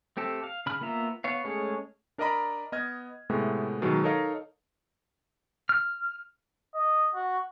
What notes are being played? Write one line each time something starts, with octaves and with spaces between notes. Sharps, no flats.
A3 C4 G4 A4
F5
C#3 B5 F6
A#3 B3 F4 E5 A#5
B3 C#5 F5
G#3 A3 C#4 G#4 C#5
D4 A#4 D5 D#5 A#5 B5
B3 D#5 F6 G#6
A2 C3 G#3 A3 B3
B2 D#3 F#3 G#3
D#4 A4 A#4 C#5 D#5 F5
F6
D#5
F#4